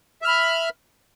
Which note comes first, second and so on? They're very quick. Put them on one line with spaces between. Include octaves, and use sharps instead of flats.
E5 F6 B5